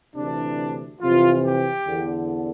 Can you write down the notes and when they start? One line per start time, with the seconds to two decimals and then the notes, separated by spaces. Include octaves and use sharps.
0.16 D2 C3 E3 D4
1.01 F2 C3 E3 F4
1.44 G4
1.86 E2 D3